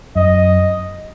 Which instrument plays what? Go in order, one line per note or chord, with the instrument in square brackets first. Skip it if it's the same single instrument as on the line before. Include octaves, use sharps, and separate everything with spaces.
[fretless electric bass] F#2 [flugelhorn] D#5